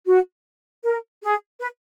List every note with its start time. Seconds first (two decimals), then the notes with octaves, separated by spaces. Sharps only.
0.07 F#4
0.83 A#4
1.22 G#4
1.60 B4